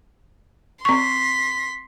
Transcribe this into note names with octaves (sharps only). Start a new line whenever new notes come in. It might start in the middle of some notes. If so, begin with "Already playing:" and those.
C4 C6 C#6 B6